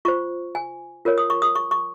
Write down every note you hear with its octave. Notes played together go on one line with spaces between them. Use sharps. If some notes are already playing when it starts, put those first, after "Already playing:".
F4 C5 C#6
G#5
F4 A#4 C#5
D#6
C#6
D#6
C#6
C#6